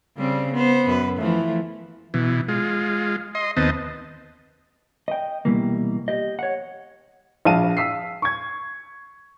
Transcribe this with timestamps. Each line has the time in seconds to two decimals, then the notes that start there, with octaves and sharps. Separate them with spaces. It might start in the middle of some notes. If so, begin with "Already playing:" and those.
0.17 C#3 G3 C4
0.53 B3 C5
0.86 F#2 B4
1.18 E3 F3 A3
2.14 B2 E3
2.48 G#3 F4
3.35 D#5 C6
3.57 D#2 B3 C4 D#5 A5
5.08 D#5 G5
5.45 C2 B2 E3 G3 A#3
6.08 G4 D#5
6.39 C#5 F#5
7.45 A#1 F5 A5 D#7
7.77 F5 E6 B6 C7
8.22 C#6 G#6